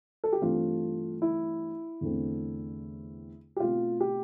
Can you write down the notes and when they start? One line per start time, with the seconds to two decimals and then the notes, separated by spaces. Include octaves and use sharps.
0.24 A4
0.33 G4
0.42 G2 E3 A3 C4 F4
1.22 E4
2.01 E2 D3 A3 C4
3.56 G4
3.60 B2 A3 C4 F4
4.00 G4